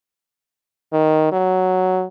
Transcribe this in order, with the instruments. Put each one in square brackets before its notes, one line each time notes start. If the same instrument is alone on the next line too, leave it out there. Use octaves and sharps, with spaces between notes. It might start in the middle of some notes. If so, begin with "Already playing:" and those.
[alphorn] D#3
F#3